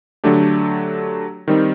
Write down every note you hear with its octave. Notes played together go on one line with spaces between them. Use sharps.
D3 F#3 A3 D4 G4
D#3 G3 C4 D#4